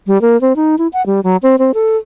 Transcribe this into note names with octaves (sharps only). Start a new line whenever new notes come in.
G3
A#3
C4
D#4
E4
F#5
G3
F#3
C4
C4
A4